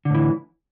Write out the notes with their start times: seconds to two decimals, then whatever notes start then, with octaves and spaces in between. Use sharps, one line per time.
0.05 D3
0.10 A2
0.15 E3